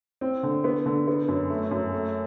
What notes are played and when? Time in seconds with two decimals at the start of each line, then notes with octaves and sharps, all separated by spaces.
0.21 C4
0.43 D3
0.64 B3
0.86 D3
1.07 B3
1.28 F#2
1.50 A3
1.71 F#2
1.92 A3